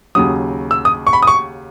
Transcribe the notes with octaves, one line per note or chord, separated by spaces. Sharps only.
D#2 C#3 F#3 D#6
E6
D#6
C#6
B5
D#6
C#6